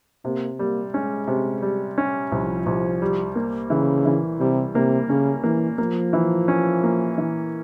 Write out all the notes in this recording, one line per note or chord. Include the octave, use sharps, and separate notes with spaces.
C3 A#3
G3 A#3
G#3 C#4
C3
G3
C#4
C2 F3
C2
G3
A#3
C#3 E3
E3
C3 G3
C3 A#3
C#3 C#4
E3 A#3
F3 A#3
E3
C#4
A#3
E3